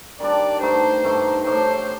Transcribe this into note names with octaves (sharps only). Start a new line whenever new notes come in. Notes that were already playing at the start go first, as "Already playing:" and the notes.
D#3 G3 D4 D5
G2 D#3 A3 D#4 C5
G2 D#3 A3 D#4
A2 A3 D4 C5